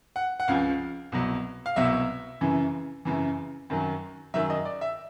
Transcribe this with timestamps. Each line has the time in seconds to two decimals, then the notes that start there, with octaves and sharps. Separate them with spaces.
0.16 F#5
0.40 F#5
0.48 C#2 C#3 F3 F5
1.12 C2 B2 F#3
1.66 F5
1.76 C2 B2 F#3 E5
2.41 F#2 C#3 E3
3.05 F#2 C#3 E3
3.70 F#2 D#3 F#3
4.34 F#2 D#3 F#3 E5
4.50 D#5
4.65 D5
4.81 E5